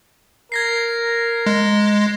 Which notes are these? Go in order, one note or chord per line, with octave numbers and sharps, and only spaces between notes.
A#4 G#6 A#6 C7
G#3